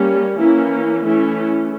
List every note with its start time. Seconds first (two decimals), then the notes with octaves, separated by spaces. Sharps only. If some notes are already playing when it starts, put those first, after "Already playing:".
Already playing: G3 A#3 C#4
0.38 E3 A#3 C#4 E4
1.04 E3 A3 C#4 E4